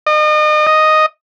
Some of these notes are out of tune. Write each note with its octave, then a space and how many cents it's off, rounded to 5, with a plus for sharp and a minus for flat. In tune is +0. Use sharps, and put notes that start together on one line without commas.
D#5 -35
D#5 +0